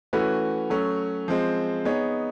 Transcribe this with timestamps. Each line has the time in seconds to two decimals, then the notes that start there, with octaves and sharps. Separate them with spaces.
0.13 E3 A3 C#4 F#4 B4
0.70 F#3 A3 C#4
1.28 F3 G#3 C4
1.85 B3 D#4 G#4 C#5